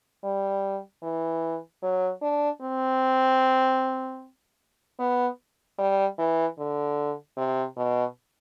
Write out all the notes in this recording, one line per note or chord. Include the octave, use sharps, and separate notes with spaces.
G3
E3
F#3
D4
C4
B3
G3
E3
D3
C3
B2